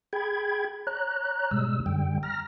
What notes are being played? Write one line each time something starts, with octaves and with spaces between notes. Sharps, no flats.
G#4 G5 B5 G#6
C#5 A#5 F#6
G#2 B2 G3 G#3 E6
F#2 D3 G3 G5
A#5 F6 A#6